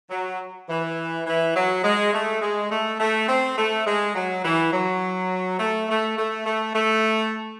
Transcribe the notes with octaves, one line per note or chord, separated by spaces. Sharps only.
F#3
E3
E3
F#3
G#3
A3
G#3
A3
A3
C4
A3
G#3
F#3
E3
F#3
A3
A3
A3
A3
A3